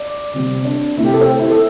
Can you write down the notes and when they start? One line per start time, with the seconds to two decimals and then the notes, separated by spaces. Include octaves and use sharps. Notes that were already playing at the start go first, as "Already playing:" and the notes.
Already playing: D5
0.33 C3 G3 C4
0.65 D4
0.97 C3 A3 C4 E4
1.05 G4
1.14 A4
1.21 C5
1.39 E4
1.50 A4